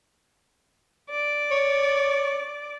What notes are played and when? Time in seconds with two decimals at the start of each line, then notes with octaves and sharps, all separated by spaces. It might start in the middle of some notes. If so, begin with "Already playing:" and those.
1.11 D5
1.51 C#5